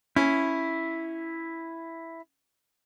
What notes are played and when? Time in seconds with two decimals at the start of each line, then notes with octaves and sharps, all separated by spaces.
0.16 C#4 E4